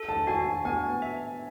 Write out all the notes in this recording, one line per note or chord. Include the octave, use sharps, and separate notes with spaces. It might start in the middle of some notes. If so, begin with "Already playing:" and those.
Already playing: A4
A5
F#4 G#5
A5
B3 G#5
E5